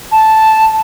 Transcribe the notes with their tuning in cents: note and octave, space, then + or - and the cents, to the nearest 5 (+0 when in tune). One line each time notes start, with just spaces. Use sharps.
A5 -5